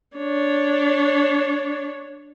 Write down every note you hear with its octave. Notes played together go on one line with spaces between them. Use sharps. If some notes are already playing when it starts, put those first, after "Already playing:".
D4 C#5